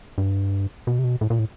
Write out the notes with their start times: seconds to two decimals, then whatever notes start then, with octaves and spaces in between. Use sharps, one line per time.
0.18 G2
0.87 B2
0.99 C3
1.04 B2
1.21 A2
1.30 A#2
1.39 A2